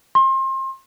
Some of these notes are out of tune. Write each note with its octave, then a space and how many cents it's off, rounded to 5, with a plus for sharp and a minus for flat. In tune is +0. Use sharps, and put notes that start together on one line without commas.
C6 +30